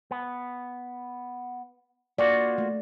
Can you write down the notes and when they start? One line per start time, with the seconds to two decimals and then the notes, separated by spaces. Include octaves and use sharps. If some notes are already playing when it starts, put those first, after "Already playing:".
0.11 B3
2.18 A#3 F4 F#4 D5
2.58 A3